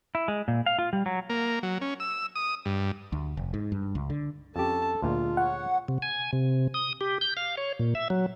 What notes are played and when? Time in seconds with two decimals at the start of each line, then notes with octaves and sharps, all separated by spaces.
0.15 E4
0.28 G#3
0.48 A#2
0.66 F5
0.79 F4
0.93 G3
1.06 F#3
1.30 A#3
1.63 F#3
1.81 C#4
2.00 E6
2.35 D#6
2.66 G2
3.12 D2
3.37 F1
3.54 G#2
3.72 G2
3.95 C#2
4.10 D3
4.56 F2 C#4 G4 A4 A5
5.02 D2 A#2 G#3 F4
5.37 C#5 F#5
5.88 C3
6.02 G#5
6.33 C3
6.74 D#6
7.01 G4
7.21 G6
7.37 F5
7.57 C#5
7.79 A#2
7.95 E5
8.10 F#3